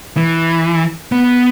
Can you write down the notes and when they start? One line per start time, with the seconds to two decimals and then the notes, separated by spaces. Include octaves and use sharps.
0.17 E3
1.12 B3